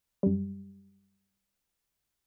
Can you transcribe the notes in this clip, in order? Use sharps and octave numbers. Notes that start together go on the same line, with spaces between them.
F#2 G3